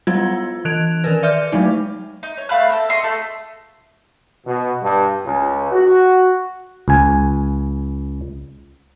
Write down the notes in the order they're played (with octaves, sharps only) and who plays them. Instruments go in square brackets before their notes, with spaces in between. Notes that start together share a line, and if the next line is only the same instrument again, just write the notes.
[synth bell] F#3 G3 B3 F4 G#6
E3 F#6 G#6 D7 F7
D#3 A#4 B4
D5 E5 F6 G6
F#3 G#3 A3 D#4
[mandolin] D#4
C#5
A3 F5 B5 F#6
C4 A4
D#5 E5 C6 C#6
A3 F4 A4
[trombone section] B2
G2
C#2
F#4
[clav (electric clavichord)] C#2 G#5